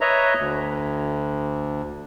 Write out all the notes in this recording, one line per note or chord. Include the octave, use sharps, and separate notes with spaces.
B4 C#5 D#5 E5 A#5
D2